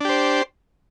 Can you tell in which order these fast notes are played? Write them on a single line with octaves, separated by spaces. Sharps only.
D4 G4 C5